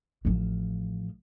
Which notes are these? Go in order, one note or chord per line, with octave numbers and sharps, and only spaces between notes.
A1 F3